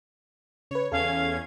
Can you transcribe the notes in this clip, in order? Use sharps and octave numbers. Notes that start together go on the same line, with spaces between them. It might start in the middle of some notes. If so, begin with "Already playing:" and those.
C#3 B4 C#5
E2 C#4 A4 F5 G#6